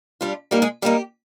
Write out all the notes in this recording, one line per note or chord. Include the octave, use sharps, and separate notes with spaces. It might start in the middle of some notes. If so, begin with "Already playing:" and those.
G3 D4 F4
G3 A#3 D#4 G4
G#3 G#4
G3 A#3 D#4 G4